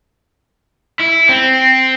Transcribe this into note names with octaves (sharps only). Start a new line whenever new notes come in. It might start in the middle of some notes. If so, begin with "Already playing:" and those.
E4
C4